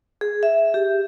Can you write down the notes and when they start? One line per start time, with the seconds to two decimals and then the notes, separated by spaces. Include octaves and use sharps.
0.21 G#4
0.43 E5
0.74 G4